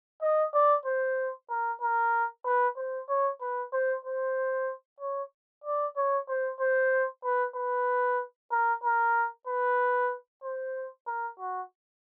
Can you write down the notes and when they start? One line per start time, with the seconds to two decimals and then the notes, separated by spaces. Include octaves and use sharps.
0.22 D#5
0.54 D5
0.86 C5
1.50 A#4
1.82 A#4
2.46 B4
2.77 C5
3.09 C#5
3.41 B4
3.73 C5
4.05 C5
5.01 C#5
5.64 D5
5.97 C#5
6.29 C5
6.60 C5
7.24 B4
7.56 B4
8.52 A#4
8.84 A#4
9.47 B4
10.43 C5
11.07 A#4
11.39 F#4